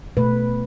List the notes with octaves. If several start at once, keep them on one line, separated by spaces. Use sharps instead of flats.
B2 A3 B4